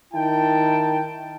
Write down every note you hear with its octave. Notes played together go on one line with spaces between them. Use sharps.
D#3 E4 G5 A5